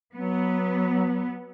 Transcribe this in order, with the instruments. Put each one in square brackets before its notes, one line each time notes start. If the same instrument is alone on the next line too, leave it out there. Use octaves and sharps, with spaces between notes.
[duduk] F#3 [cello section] B3